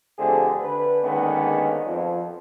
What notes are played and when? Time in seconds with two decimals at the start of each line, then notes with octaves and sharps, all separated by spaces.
0.19 F2 D3 A3 G4 G#4 C5
0.62 D3 B4
1.03 D3 D#3 G#3 A#3 B3 C#4
1.87 F2 F3